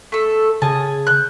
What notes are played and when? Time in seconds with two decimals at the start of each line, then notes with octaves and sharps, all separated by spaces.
0.12 A3 A4
0.62 C#3 G#4 A5
1.07 F#6 G6